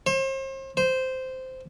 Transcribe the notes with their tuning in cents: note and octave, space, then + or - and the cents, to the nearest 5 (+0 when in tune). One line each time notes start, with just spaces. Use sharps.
C5 +40
C5 -10